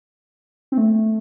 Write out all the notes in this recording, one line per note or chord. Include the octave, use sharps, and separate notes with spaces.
C4
A3